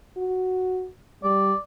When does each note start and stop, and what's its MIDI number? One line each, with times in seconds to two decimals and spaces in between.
0.17 0.88 66
1.23 1.53 55
1.23 1.58 74